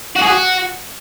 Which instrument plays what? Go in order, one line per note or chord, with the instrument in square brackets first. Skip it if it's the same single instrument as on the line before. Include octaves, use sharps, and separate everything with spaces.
[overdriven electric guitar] F#4
G#4
F#4